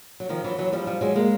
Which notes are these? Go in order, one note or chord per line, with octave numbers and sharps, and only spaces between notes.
F#3
D#3 F3
E3 F#3
E3 F#3
F3 G3
F3 G3
F#3 G#3
G#3 A#3